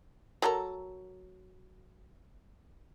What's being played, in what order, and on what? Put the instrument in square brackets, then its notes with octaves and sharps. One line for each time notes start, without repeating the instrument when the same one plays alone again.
[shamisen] F#3 A4 A#4